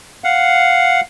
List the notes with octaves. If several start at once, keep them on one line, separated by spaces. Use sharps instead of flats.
F5 F#5